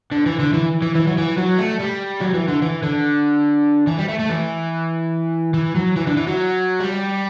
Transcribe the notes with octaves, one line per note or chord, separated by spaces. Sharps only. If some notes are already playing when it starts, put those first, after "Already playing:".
D3
E3
D3
E3
E3
E3
F#3
E3
F#3
A3
G3
F#3
E3
D3
E3
D3
E3
G3
A3
A3
E3
E3
F#3
E3
D3
E3
F#3
G3